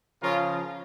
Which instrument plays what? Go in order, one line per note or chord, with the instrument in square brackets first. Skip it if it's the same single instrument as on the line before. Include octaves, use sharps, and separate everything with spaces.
[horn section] C#3 F3 C#4 F4 A#4